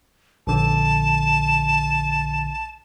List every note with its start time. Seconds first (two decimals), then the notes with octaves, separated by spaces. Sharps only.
0.47 A#1 D3 A5